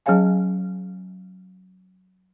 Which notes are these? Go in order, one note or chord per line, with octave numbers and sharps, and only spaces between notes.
F#3 C#4 G#4 C#5 F5 G#5